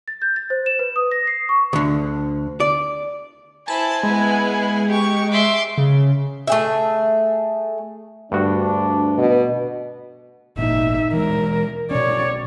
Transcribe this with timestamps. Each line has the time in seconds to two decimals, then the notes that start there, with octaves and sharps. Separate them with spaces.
0.08 A6
0.22 G6
0.36 A6
0.50 C5
0.66 E7
0.79 B4
0.96 D#6
1.11 A#6
1.27 C7
1.49 C#6
1.73 D2 D3
2.60 D5
3.68 E4 C5 G#5 A5
4.03 G#3 B3 E4
4.90 G4 C#6
5.31 E5 C6 D6
5.78 C#3
6.47 A3 G#4 E5
8.32 D2 G2 D4 F#4
9.18 B2
10.58 G#1 A#2 A#3 D#4 E5
11.13 E3 G#3 A#4
11.91 B2 C#4 C#5 D5